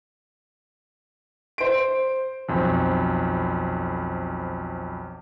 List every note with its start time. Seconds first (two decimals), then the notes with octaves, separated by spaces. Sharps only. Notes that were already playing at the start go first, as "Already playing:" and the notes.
1.58 C5 D7
2.48 B1 F2 C5